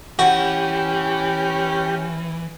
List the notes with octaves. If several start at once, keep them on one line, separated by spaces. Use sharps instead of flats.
E3 C#4 F#4 G4